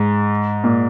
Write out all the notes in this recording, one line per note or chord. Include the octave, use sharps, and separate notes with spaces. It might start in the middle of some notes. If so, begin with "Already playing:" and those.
Already playing: G#2
A#2